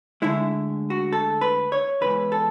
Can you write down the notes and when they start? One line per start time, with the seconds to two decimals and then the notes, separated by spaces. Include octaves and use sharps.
0.22 D2 D3 G#3 E4
0.90 F#4
1.13 A4
1.41 B4
1.72 C#5
2.01 E2 C#3 E3 G#3 B4
2.32 A4